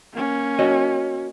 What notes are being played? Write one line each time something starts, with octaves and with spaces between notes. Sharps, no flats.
A#3 C#4
F#4 C#5 D#5